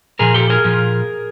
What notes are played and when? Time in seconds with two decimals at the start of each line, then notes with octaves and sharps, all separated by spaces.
0.19 A#2 F3 G#4 A#4
0.34 G4 A4
0.50 G#4 A#4
0.65 A#2 F3